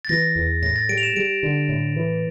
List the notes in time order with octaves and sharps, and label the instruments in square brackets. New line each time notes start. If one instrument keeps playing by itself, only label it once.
[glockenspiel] A6
[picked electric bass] E3 [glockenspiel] A#6
[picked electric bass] E2
[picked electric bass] A2 [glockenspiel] A#6
[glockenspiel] A6
[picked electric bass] G3 [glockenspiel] D7
[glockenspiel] F7
E7
[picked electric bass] G3 [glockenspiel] D7
[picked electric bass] D3
A2
E3